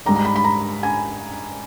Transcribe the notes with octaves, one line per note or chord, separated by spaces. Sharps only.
G#2 G3 A#5
A#5
B5
B5
A#5
G#5